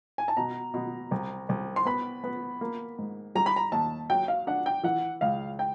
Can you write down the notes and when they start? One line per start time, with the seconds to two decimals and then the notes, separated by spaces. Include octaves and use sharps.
0.18 G#5
0.28 A5
0.37 B2 A#5
0.74 B2
1.11 C2
1.49 C2
1.76 C6
1.85 B3 B5
2.24 B3
2.61 A#3
2.98 G#2
3.35 G3 A#5
3.46 B5
3.56 A#5
3.72 D#2 A5
4.10 F#3 G5
4.28 F5
4.47 D4 F#5
4.66 G5
4.83 E3 F#5
5.21 C#2 F5
5.59 G5